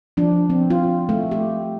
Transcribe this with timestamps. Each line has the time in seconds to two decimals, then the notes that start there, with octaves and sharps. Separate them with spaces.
0.17 F3 D4
0.50 C4
0.70 F4
1.09 A3
1.31 G4